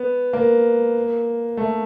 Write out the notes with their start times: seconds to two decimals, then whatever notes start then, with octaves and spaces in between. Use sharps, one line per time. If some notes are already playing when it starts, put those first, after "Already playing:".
Already playing: B3
0.33 A#3
1.57 A3